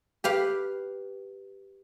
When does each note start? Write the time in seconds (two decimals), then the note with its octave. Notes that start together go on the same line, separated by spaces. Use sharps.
0.24 G4 B4 F5